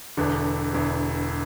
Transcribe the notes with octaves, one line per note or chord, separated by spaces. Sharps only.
E1 E2 D3
E1 E2 D3